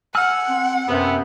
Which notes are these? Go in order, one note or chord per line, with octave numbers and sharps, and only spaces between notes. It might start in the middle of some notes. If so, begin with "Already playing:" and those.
F#5 G#5 E6 F6
C4
F#2 C3 B3